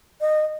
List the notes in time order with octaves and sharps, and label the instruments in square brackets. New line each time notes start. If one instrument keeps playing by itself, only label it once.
[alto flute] D#5